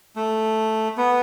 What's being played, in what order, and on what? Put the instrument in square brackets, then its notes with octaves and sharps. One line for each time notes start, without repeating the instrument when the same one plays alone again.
[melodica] A3
B3